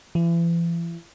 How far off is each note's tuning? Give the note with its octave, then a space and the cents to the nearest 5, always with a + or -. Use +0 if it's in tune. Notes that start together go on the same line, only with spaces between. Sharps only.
E3 +40